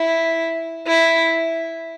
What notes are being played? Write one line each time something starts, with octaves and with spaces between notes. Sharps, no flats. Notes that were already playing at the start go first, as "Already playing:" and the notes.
Already playing: E4
E4